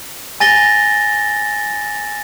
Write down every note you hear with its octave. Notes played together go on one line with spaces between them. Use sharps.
G#5 A6 A#6 G7